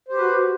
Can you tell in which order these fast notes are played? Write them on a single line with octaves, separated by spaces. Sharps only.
C5 G4 B4 F#4